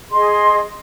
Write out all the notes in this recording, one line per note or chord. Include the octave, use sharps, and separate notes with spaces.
G#4 D#5 C6